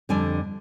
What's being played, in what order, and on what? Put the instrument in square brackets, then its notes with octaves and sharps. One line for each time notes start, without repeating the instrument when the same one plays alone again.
[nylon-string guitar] F2 D3 G3 G#5